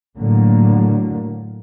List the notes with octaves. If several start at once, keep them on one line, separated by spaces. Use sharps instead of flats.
A2 D3 F#3 A#3